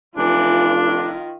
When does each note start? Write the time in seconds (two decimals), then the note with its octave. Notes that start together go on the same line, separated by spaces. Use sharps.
0.17 F1 E3 D4 F4
0.85 D#3